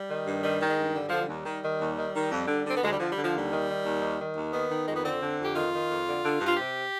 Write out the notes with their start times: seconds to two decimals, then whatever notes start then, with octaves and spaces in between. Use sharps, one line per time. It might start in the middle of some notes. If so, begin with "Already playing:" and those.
Already playing: G3
0.09 D#3
0.27 G2
0.43 D#3 G3
0.61 D#3
0.69 G#3
0.78 G2
0.95 D3 G3
1.09 D3 F3
1.22 G3
1.29 D#2
1.45 D#3
1.63 D#3
1.80 D#2
1.97 D#3
2.15 D#3
2.31 F2
2.48 D3
2.65 D3 C4
2.77 B3
2.83 D2 G#3
2.91 G3
2.99 D3 F3
3.12 G3
3.17 D3
3.24 F3
3.34 D#2 G3
3.51 D#3
3.67 D#3
3.85 D#2
4.01 D#3
4.19 D#3
4.36 D#2
4.52 D#3 B3
4.70 D#3
4.88 F2 G#3
4.96 B3
5.04 D3 C4
5.22 D3
5.38 F2
5.44 G4
5.55 D#3 F4
5.72 D#3
5.90 F2
6.06 D3
6.24 D3
6.40 G2
6.47 F4
6.57 C3 G4